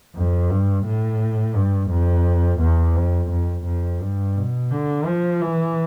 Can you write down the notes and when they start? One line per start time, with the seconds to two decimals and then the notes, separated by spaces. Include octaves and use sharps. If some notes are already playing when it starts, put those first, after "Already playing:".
0.15 F2
0.50 G2
0.85 A2
1.55 G2
1.90 F2
2.60 E2
2.96 F2
3.31 F2
3.66 F2
4.01 G2
4.36 B2
4.71 D3
5.06 F3
5.41 E3